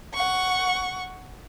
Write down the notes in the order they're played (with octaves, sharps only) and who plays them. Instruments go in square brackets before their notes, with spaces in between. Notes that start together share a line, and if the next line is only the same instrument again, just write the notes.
[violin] F#5 C#6